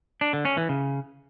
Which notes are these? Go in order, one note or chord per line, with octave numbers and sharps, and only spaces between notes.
D4
D3
C#4
E3
C#3